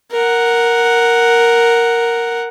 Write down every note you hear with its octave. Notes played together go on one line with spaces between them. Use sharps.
A#4 F#5